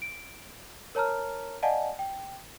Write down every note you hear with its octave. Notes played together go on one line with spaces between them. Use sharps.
D7
A#4 C#5 A5 A#5 F6
D5 D#5 F5 F#5 G#5 A5
G5